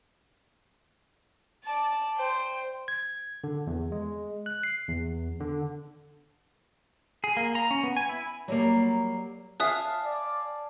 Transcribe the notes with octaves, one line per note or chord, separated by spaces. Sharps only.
D5 A5
C5 G5
G#6
D3
E2
G#3
F#6
C7
E2
D3
G#4
A#3
A#5
C#4
B3
G#5
E4
F#3 G3 A#3
E5 F5 G#5 A5 D#6 F#6
D5